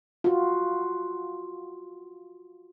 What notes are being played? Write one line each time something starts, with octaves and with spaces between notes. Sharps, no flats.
F4 F#4